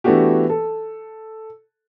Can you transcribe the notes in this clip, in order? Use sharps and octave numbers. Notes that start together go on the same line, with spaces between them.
E3 A3 B3 D4 F#4 G4
A4